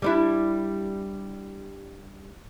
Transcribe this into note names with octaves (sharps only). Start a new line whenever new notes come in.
G3 D4 E4